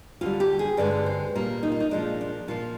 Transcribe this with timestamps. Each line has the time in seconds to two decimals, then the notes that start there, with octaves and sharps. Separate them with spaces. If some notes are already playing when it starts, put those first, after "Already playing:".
0.21 D2 D3 G3 F4
0.40 G4
0.59 G#4
0.77 G2 D3 G#3 D5
1.06 C5
1.35 A#2 G3 A#3 A#4
1.63 D#4
1.72 F4
1.80 D#4
1.91 A#2 F3 G#3 D4
2.21 D4
2.48 A#2 F3 A#3 F4